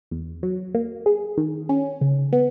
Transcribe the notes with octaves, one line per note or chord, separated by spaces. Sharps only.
E2
F#3
A#3
G#4
D#3
C#4
C#3
B3